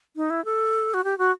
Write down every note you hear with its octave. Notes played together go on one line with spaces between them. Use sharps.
D#4
E4
A4
F#4
G4
F#4